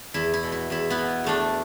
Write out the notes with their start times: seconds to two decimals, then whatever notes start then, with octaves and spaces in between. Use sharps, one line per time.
0.14 E2 E4
0.34 E4
0.43 B2
0.52 E4
0.70 E2 E4
0.90 B3 E4
0.98 B2
1.24 E2 A3 D4